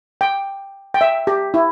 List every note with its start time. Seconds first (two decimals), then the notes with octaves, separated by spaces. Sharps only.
0.21 G5
0.94 G5
1.01 E5
1.27 G4
1.54 E4